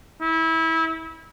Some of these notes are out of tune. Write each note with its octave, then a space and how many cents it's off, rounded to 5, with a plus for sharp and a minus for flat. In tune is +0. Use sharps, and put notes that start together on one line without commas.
E4 -25